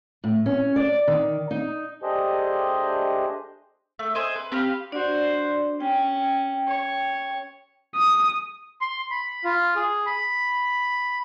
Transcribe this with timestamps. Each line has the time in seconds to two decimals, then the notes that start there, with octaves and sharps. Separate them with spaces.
0.24 A2
0.46 C#4
0.76 D5
1.08 D#3
1.51 D#4
2.02 A3 D4 G4 G#4 C5 D#5
3.99 A3
4.15 G#4 C5 D#5
4.36 B4
4.52 C4 G4 B4 F5
4.92 D4 F#4 C5 D5
5.80 C#4 G5
6.67 C#5
7.95 D#6
8.81 C6
9.11 B5
9.44 F4
9.75 G#4
10.06 B5